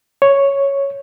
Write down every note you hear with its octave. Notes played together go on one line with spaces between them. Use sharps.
C#5